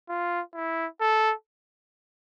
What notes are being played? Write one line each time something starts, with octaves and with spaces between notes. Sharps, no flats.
F4
E4
A4